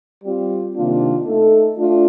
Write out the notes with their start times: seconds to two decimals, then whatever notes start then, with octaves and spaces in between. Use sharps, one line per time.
0.24 G3 C4 F4
0.76 C3 D#3 A#3 D4 F4
1.26 A3 D#4 A4
1.78 A3 D4 F4